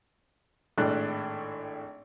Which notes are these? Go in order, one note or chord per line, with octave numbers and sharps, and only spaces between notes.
G#1 A2 D4 F#6